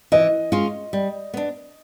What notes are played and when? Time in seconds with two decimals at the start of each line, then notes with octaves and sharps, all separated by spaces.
0.12 E3 D#5
0.52 G#3 C#4 F4
0.93 G3
1.34 B3 D4